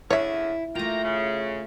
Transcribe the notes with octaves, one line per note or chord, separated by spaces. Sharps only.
D3 C#4 E4 G#4 C#5 E5
A3 A#3 F4 G5 A#5
C#3